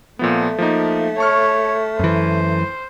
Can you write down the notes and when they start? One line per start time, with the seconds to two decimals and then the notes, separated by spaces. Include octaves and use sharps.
0.19 A#2 F3 A3 B3
0.58 F3 A#3 D#4
1.18 C#5 A5 C#6 F6
1.99 F#2 E3 C5